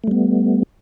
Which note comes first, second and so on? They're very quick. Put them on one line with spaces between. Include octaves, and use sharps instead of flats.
A3 G3 B3